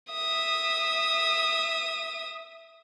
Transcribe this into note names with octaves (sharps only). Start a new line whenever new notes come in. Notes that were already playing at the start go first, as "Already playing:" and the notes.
E5 D#6